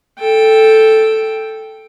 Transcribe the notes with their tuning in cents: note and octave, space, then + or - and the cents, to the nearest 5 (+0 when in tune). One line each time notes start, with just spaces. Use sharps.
A4 +0 G5 +5